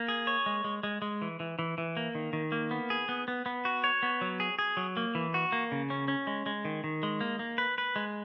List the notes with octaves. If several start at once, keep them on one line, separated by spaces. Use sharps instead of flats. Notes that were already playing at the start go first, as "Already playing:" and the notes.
Already playing: A#3
G#4
C#5
G#3
G#3
G#3
G#3
E3
E3
E3
E3
A#3
D#3
D#3
A#3
B3
G#4
B3
B3
B3
F#4
C#5
B3
F#3
G#4
G#4
F#3
A#3
E3
F#4
A#3
C#3
C#4
C#4
G#3
G#3
D#3
D#3
G#3
A#3
A#3
B4
B4
G#3